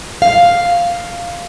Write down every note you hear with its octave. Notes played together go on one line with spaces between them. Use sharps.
F5